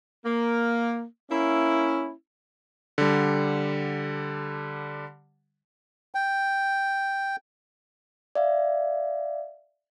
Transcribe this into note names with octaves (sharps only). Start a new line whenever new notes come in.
A#3
A#3 C#4 E4
D3 G3
G5
D5 E5 F5